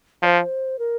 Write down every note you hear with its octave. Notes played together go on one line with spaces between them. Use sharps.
F3 C5 D5
A#4